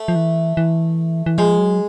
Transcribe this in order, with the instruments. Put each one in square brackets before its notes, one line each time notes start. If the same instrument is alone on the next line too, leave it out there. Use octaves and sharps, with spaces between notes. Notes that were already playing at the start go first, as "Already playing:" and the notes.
Already playing: [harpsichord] A3
[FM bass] F3
E3
E3
E3
[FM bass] F3 [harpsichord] G#3
[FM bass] F#3